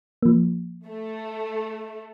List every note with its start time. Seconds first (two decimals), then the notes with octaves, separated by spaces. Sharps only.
0.22 F3 A#3
0.87 A3